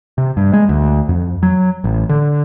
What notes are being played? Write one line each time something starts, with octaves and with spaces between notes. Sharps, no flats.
C3
G2
G#3
D2
F2
F#3
A1
D3